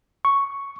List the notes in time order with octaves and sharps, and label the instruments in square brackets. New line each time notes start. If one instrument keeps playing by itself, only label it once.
[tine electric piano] C#6